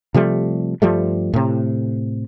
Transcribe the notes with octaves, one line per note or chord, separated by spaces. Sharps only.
C3 F3 G3 A3
G2 F3 G3 A3
A2 C3